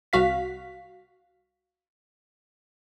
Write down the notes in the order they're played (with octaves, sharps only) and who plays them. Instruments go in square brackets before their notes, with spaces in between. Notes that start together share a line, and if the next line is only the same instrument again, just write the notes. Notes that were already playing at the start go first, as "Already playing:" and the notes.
[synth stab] C2 F#4 F5 B6